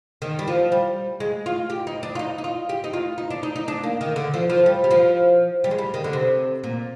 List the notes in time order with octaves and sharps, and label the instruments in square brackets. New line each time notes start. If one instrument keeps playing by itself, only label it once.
[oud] D#3
G3
F3
G3
G#3
F4
G4
D#4
D4
F4
D#4
D#4
F4
G4
D#4
F4
D#4
D4
D#4
D#4
D4
A#3
D#3
D3
F3
F3
G3
G3
F3
G3
G#3
G3
D#3
D3
C3
A#2